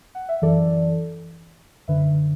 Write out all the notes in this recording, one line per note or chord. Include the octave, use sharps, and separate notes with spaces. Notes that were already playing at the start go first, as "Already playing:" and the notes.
F#5
E5
F#2 E3 A4 D5
F#2 D3 B4 E5